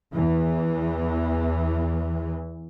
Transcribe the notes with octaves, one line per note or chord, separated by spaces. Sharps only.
E2 E3